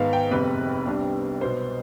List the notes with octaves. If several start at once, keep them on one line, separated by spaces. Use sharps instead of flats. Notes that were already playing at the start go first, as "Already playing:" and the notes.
Already playing: G#2 D#3 B3 D#4 F5
G5
G1 F2 C3 B4
C2 C3 G3 D4
B1 B2 B3 C5